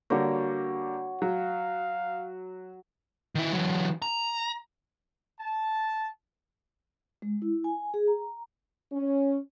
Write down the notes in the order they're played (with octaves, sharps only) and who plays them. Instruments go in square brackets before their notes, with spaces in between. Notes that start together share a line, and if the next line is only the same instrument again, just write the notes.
[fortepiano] D3 G3 A#3 [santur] F#4 C#5
[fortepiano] F#3 [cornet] F5
[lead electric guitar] D#3 E4
E3 F#3
A#5
[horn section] A5
[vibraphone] G#3
E4
G#5
G#4
A#5
[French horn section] C#4